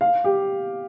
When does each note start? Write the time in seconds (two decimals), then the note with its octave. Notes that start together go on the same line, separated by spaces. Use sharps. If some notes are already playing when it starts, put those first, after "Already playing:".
0.01 F5
0.24 G4